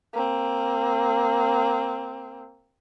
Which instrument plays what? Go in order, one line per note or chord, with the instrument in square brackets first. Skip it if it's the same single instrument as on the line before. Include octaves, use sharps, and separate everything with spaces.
[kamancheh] A#3 C4